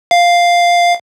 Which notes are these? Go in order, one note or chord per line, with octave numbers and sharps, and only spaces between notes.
F5